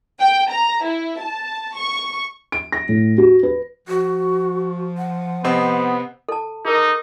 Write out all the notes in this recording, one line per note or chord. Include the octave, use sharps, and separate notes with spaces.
G5
A#5
E4
A5
C#6
D7
A#6
A2
F#4
B4
F3 F#4
F#5
C3 B3 C4 D#5
A4 A5
D#4 G#4 A#4